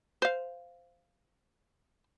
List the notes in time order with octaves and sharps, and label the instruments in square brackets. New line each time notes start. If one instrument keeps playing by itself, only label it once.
[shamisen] C5 F5